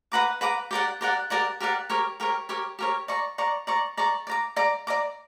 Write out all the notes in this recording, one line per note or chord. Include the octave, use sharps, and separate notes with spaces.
B4 F#5 A#5 D6
B4 F#5 A#5 D6
G4 A#4 D5 F#5
G4 A#4 D5 F#5
G4 A#4 D5 F#5
G4 A#4 D5 F#5
G4 A#4 C#5
G4 A#4 C#5
G4 A#4 C#5
G4 A#4 C#5
D5 A#5 C#6
D5 A#5 C#6
D5 A#5 C#6
D5 A#5 C#6
D5
A#5 D6
D5 A#5 D6
D5 A#5 D6